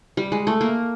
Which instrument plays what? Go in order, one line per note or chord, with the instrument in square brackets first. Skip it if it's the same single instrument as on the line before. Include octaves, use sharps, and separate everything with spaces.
[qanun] G3
G#3
A3
A#3